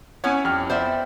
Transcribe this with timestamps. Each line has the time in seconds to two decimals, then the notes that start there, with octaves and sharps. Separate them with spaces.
0.24 B3 C#4 E4 C#5 F#5 G#5
0.45 F2 G3 F6
0.70 B3 C5 D5 E5 B5